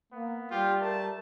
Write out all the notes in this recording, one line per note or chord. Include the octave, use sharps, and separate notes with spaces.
A#3 B3
G3 F4 G4
A3 A#4 A5